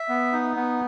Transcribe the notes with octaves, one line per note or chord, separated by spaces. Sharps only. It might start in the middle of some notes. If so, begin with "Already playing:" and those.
Already playing: E5
B3
D#4
B3